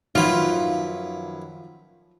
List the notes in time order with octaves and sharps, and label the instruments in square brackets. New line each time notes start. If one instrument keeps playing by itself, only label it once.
[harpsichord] F#2 E4 B4 [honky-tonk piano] D#3 F3 [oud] F4